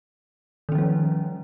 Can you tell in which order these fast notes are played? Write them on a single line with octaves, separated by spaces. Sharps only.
D#3 C#4 F3 G3